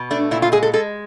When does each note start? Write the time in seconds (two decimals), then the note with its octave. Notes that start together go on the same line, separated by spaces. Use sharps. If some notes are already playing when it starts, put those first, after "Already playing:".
Already playing: B2
0.11 A3 D4
0.31 A#2 E4
0.42 F4
0.52 G#3 G#4
0.63 A4
0.73 G#3 A4